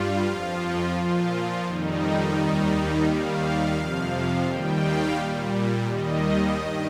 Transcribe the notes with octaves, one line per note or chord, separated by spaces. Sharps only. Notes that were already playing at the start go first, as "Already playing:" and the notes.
Already playing: G2 G3 F4
F2 F3
A#2 F3 F4
F2 D#3 G3 D#4
D#2 D#3 G3
D#2 D#3 G3 F5
F2 C3 F3
D#2 D#3 G3 G5
F5
A#2 G3
D#2 D#3 G3 D#5
G2 D#3